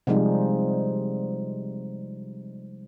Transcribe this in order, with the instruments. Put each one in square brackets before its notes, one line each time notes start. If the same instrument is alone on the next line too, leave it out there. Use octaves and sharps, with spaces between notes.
[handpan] C3 F3 G3 G#3 D#4